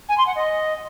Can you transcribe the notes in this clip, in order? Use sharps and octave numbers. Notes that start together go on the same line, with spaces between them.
G#5
C6
F#5
D#5